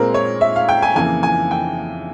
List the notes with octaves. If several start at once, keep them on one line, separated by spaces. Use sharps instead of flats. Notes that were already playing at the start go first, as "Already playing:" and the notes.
Already playing: A#2 G#3 C4 A#4
C#5
E5
F5
G5
G#5
F2 C#3 E3 A#3 G#5
G#5
G5